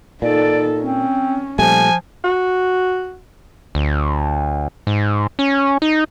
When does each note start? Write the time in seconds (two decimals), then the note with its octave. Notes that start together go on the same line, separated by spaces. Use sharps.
0.22 A#2 D#4 A4 D5
0.81 C4 C#4
1.59 A#2 F3 G3 A3 G#5
2.24 F#4
3.75 D2
4.87 G#2
5.39 C#4
5.82 D#4